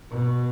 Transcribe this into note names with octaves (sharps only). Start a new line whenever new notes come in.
B2